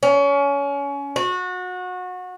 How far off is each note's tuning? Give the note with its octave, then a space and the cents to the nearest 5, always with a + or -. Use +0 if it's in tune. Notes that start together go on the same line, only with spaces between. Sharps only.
C#4 +25
F#4 -25